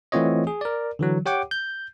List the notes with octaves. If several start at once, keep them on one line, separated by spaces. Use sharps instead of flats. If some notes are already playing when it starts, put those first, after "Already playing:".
E3 A3 C4 F4 C#5 D#5
G#4
A#4 D5
D3 E3 F#3
G4 C#5 F#5 G5 D6
G6